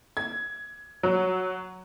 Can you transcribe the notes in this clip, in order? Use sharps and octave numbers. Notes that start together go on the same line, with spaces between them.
G#6
F#3